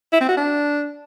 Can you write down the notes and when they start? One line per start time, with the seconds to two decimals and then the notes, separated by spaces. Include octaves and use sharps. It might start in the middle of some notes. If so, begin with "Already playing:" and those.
0.13 E4
0.21 C4
0.29 F#4
0.37 D4